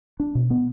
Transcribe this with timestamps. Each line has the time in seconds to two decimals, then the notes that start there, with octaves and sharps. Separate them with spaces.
0.20 D4
0.35 B2
0.50 B3